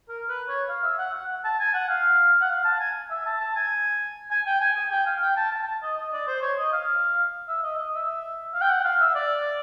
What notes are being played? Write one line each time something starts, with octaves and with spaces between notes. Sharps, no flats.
A#4
B4
C#5
F5
E5
F#5
F#5
A5
G#5
F#5
F5
F#5
F5
A5
G#5
E5
A5
A5
G#5
G#5
G5
G#5
G#5
G5
F5
G5
A5
A5
A5
D#5
D#5
D5
C5
C#5
D#5
F5
E5
D#5
D#5
E5
F5
G5
F#5
F5
E5
D5